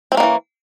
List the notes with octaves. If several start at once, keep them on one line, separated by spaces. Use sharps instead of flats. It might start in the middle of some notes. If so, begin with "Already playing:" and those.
D#3 E3 A#3 C4 C#4